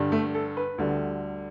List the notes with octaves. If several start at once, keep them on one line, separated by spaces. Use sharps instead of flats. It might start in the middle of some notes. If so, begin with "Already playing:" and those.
Already playing: G2 D3 G3
A3
A4
B4
D2 D3 G3